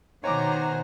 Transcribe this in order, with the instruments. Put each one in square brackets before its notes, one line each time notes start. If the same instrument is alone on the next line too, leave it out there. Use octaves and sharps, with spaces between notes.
[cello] B2 D#3 [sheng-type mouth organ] C5 F#5 G#5 [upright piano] C#5 D6 [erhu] A#5